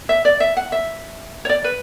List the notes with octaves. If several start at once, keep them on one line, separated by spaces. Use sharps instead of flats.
E5
D5
E5
F#5
E5
C#5
D5
B4